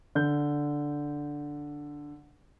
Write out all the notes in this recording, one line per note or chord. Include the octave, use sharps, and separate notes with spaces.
D3 G6